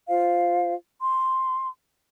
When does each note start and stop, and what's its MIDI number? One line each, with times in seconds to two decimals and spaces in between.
0.09 0.72 65
0.09 0.72 72
0.09 0.72 77
1.01 1.67 84